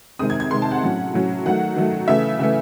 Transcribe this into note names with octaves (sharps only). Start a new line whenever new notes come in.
C3 D#3 G#3 C4 D#6
G#6
G#6
C3 D#3 G#3 C4 C6
A5
F#5
A2 F#3 C#4
A2 F#3 C#4
D#3 F#3 A3 F#5
D#3 F#3 A3
C#3 E3 A3 E5
C#3 E3 A3